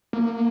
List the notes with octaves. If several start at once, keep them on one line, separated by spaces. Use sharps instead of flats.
A#3